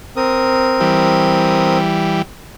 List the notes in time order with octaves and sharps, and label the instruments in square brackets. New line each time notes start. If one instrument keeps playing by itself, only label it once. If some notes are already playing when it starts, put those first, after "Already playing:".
[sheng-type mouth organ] C4 A#4 D#6
[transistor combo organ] E3 G3